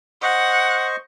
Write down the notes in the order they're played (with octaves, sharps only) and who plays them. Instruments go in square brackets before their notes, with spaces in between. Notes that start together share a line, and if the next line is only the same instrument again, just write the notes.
[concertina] C5 D#5 C#6 [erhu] F#5